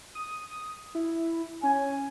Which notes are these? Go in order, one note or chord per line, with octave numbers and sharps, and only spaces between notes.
D#6
E4
C#4 G#5